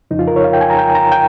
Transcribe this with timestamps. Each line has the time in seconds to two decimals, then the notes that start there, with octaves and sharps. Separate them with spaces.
0.11 F2 C#3 F3 D#4
0.19 F4
0.28 A#4
0.36 C#5
0.44 F5
0.53 G5
0.61 G#5
0.70 A#5
0.78 G5
0.95 A#5
1.12 G5